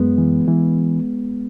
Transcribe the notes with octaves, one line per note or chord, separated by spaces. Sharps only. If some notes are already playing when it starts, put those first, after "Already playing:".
Already playing: F#2 G#3 B3
E3
E3